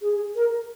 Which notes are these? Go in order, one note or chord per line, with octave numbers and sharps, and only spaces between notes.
G#4
A#4